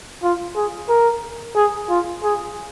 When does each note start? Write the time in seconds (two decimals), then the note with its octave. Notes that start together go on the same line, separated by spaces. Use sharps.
0.23 F4
0.56 G#4
0.89 A#4
1.56 G#4
1.89 F4
2.24 G#4